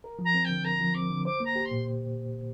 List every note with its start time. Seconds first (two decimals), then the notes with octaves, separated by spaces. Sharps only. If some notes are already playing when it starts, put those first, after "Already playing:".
0.04 A#4
0.19 F3
0.25 A#5
0.34 C4
0.45 D3 G5
0.65 A#4 A#5
0.80 F3
0.95 C4 D6
1.10 D3
1.25 C5 D6
1.40 A#3 A#5
1.56 G4
1.65 C6
1.71 A#2